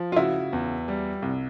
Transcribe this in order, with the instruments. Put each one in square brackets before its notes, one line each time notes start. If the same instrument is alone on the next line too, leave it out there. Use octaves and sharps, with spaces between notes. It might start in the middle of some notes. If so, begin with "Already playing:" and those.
Already playing: [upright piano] F3
[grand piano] F4
[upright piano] C#3 [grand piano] E4 F#4
[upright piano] E2
G3
C2